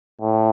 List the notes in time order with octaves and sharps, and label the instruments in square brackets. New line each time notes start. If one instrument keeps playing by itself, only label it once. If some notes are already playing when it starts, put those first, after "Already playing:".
[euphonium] A2